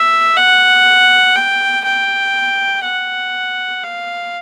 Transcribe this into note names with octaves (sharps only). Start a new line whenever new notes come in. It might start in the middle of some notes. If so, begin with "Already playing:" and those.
Already playing: E5
F#5
G5
G5
F#5
F5